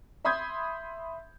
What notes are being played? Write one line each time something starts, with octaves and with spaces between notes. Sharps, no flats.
E5 B5 C6 D#6 G6 G#6